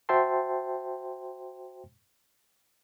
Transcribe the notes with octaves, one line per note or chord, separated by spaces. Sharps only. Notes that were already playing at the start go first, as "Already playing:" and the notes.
F#4 C5 E5 G5 A5 C6